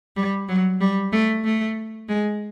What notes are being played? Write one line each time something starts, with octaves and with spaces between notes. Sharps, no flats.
G3
F#3
G3
A3
A3
G#3